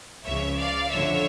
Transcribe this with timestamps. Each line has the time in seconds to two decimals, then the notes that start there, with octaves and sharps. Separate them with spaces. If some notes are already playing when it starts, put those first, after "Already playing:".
0.25 C#2 C#3 F3 C#5 E5
0.57 D5 F5
0.91 F2 D3 F3 C#5 E5